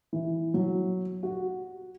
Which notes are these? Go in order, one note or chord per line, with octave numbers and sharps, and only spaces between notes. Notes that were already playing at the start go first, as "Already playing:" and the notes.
E3
F#3
F#4